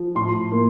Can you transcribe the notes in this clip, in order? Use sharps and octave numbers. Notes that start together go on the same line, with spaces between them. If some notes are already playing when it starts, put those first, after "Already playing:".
Already playing: F3
A2 C6
A#3